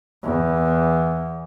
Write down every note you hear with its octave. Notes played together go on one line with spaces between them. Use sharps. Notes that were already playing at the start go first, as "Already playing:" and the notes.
E2